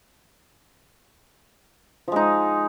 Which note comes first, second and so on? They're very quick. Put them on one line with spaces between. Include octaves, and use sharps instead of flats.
F3 G#3 D#4